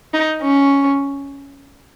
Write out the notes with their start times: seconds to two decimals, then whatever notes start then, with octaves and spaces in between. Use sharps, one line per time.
0.14 D#4
0.42 C#4